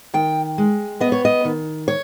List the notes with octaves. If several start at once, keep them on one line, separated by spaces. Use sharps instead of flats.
D#3 G5
G#3
B3 D#5
C#5
D#5
D#3
C#5